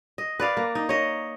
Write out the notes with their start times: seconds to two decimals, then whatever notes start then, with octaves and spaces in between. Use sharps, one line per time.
0.18 D#5
0.40 B4 D5 F5
0.57 A#3
0.75 D#4
0.89 C#5 D#5